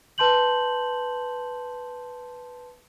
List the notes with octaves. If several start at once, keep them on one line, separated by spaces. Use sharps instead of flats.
B4 A5 C6 G6 F#7